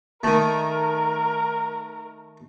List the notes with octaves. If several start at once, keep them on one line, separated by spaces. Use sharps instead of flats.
D#3 A3 A#4